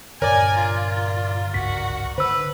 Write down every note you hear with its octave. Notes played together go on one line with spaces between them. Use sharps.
G2 A#2 D3 A#4 C#5 D5 G#5
F4
G1 C#2 G#2 F#4 B6
D3 B4 C5 E6